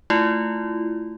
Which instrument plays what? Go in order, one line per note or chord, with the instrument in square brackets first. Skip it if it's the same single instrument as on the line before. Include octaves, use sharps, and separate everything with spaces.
[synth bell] A3 E4 F4